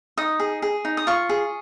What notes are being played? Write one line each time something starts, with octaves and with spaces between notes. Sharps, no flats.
D#4 D#6
G#4
G#4
D#4
D#6
F4 C#6
G#4